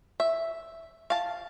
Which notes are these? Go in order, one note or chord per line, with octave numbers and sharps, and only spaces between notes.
E5
F5 A5